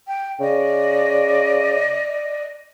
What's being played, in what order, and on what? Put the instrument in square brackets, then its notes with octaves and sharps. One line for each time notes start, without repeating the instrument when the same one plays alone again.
[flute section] G5
[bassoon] C#3 [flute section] D5 D#5